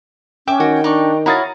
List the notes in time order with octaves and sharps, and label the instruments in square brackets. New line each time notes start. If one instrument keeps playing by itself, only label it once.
[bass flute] C#4 [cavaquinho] E5 D6 [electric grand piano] G5
[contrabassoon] D#3 [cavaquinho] F#4
[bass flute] D4 [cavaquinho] D#4 D5 C#6
[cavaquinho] E4 F#4 F5 [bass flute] C#5 [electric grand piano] A#5 D#6 A6